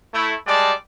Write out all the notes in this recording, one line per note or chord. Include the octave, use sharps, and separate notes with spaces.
A3 E4
G3 G#3 D5 A5